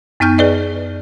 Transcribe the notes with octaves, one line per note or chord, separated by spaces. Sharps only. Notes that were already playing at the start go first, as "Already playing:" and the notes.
F#2 B3 D#4 F6 G6
G#4 B4 D5 D#5